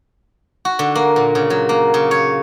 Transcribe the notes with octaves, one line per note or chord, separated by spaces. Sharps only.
F#4
D3
A#3
A#2
C#3
F#3
A#3
C#3
C#5